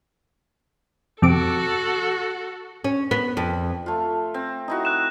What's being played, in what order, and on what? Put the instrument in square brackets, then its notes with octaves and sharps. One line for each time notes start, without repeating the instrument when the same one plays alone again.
[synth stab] F2 C3 D6 [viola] F#4 A4
[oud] C#4
B3
F2
[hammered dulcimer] A3 F4
C4
D#4 E4 F#4
[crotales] F#6 E7